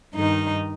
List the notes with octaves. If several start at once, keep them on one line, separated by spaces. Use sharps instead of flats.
G2 D#3 D#4